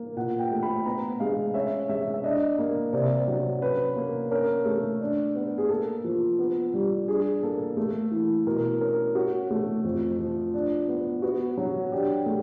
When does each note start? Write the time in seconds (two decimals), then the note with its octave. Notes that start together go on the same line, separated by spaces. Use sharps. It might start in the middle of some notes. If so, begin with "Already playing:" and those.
Already playing: A#3
0.16 A#2 F#5
0.39 G5
0.51 A3
0.63 B5
0.85 B3 A#5
1.20 G#3 F5
1.54 C#4 E5
1.89 G#3 E5
2.14 E5
2.23 D4 D#5
2.58 A#3
2.93 C3 D5
3.28 F#3
3.62 C#4 B4
3.97 A#3
4.31 C#4 A#4
4.65 A3
5.01 D4
5.36 B3
5.58 G#4
5.69 A#3 A4
6.04 F3
6.39 B3
6.74 G3
7.08 D4 G#4
7.43 A#3 A4
7.77 A3
8.11 E3
8.46 B2 A#4
8.81 C#4 A#4
9.15 C#4 F#4
9.51 A3
9.84 F2
10.19 F3
10.54 D4
10.88 B3
11.22 B3 F#4
11.57 F#3
11.92 D4 G4
12.26 A3